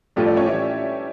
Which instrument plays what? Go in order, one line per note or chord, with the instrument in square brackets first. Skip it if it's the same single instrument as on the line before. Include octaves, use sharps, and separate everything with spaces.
[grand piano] A2 F3 A3 [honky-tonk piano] G3 G4
[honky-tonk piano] D4 D5
C#4 C#5
E3 E4